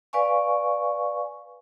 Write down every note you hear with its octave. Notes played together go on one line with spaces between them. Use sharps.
B4 D5 F5 G#5 C#6